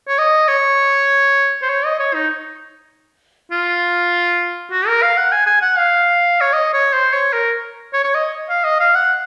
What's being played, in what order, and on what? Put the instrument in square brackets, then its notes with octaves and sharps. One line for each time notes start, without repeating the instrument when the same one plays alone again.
[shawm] C#5
D#5
C#5
C5
C#5
D#5
C#5
D#4
F4
F#4
A#4
F5
F#5
G#5
G#5
F#5
F5
C#5
D#5
C#5
C5
C#5
A#4
C#5
C#5
D#5
F5
D#5
F5
F#5